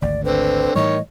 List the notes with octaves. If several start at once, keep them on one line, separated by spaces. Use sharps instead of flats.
G#1 D2 D5
D3 C4 B4
A2 D#3 E3 G3 C#5 D#5